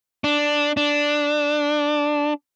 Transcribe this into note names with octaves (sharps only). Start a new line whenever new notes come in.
D4
D4